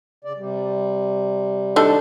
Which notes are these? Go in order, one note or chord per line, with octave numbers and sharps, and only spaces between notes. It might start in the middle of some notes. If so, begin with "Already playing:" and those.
C#3 D5
C3 G3
D#3 D4 A4